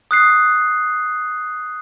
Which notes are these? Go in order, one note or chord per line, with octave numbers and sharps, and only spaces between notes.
D#6 F#6 C7